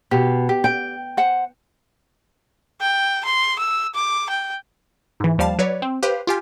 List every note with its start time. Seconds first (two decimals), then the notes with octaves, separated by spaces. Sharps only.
0.11 B2 G4
0.49 G4
0.64 G5
1.17 C5 F#5
2.81 G5
3.25 C6
3.60 E6
3.95 D6
4.30 G5
5.20 G#2 E3
5.38 D#2 F3 G3 F5 A5
5.59 F#3 B4 C#5 D5
5.82 C4
6.03 G4 B4 C5 F5
6.27 F4 G4 G#5